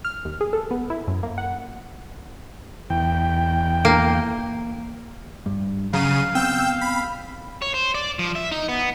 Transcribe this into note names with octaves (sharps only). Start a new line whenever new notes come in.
F6
D#2
G#4
A4
B3
E4
F#2
A#3
F#5
E2 G5
A#3
G2
C#3 F#3 F5 A#5 D#7
B3 C4 G5 E6 G6
B5
C#5
C5
D5
F3
E5
D#4
B3